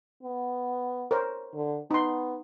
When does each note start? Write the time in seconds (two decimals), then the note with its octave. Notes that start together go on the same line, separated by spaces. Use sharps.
0.23 B3
1.11 A#4 C5 C#5
1.54 D3
1.91 B3 D#4 C6